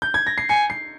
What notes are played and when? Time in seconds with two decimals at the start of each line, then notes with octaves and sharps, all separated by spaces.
0.02 G6
0.14 G#6
0.27 A#6
0.38 C7
0.49 G#5 C#7
0.70 C7